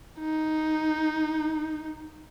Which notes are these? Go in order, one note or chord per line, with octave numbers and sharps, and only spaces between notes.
D#4